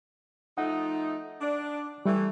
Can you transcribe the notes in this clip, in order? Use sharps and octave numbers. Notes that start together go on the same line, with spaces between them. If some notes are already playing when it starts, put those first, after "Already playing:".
F3 A3 D#4 F#5
D4
E3 G3 A3